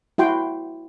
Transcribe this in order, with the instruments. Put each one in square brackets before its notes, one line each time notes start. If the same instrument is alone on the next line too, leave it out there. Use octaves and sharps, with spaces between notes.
[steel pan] E4 F#4 G5 C6